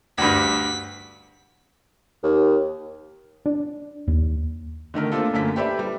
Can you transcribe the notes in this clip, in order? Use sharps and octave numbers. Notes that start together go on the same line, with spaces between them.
D2 G2 B6
D#2
D4
D#2
D3 D#3 A3 A#4
A3 A#3 C4 D4 F4 A4
F#2 D3 A3 A#3 B6
G4 A4 B4 C5 D5 E5
G3